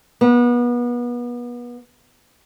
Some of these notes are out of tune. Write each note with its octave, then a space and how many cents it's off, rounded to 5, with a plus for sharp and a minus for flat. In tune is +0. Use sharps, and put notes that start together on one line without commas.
B3 -30